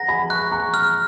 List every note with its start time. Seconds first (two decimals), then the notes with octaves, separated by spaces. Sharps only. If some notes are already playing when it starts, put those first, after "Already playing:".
Already playing: F#5 A#5 A#6
0.08 G#5 B5
0.30 A#5 C#6 F#6
0.52 A#5 C#6
0.74 F6